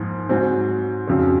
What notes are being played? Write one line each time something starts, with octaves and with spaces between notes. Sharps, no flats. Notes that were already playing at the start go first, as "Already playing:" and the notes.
Already playing: G#2 F3 A#3
G#2 F#3 C4
F2 C#3 F#3